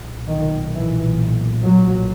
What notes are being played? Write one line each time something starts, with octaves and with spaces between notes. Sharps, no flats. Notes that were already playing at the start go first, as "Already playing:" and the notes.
Already playing: B1 A#2
D#3
E3
F#3